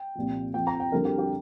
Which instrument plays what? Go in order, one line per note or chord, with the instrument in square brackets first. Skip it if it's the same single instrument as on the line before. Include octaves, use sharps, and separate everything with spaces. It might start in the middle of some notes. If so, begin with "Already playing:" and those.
Already playing: [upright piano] G5
C2 A#2 F3
F2 F3 G5
A#5
G5
F2 D3 G3 A#4
G4
G4